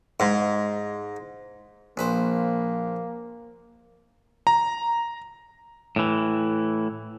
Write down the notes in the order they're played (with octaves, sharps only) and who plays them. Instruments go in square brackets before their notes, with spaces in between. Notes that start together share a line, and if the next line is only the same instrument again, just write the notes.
[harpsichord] G#2
[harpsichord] A#1 B4 C5 [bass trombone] A#3
[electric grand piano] A#5
[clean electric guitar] A2 E3